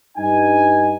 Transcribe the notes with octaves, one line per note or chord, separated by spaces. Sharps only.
G2 D#4 G#5